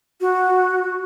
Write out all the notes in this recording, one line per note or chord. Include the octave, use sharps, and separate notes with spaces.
F#4